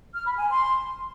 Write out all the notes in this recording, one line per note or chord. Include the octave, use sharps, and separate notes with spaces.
F6
B5
G#5
C6